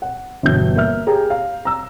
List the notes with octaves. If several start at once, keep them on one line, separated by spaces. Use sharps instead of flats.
F#5
G1 E2 B2 G6
A#3 E5 F6
G4 G#4 A#5
F5
A#5 E6